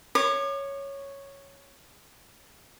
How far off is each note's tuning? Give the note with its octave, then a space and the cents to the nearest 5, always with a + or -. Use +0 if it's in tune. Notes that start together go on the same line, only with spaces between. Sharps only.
C#5 +0 D6 +45